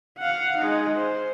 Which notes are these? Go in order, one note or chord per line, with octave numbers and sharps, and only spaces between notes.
F5 F#5
G#3 D#4
C5